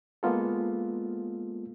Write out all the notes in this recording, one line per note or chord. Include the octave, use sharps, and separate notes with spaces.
G#3 A#3 B3 F4 A4